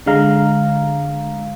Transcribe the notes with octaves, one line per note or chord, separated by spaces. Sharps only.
D3 G#3 F5 A#5